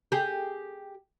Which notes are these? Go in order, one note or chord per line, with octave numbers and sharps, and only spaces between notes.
G4 G#4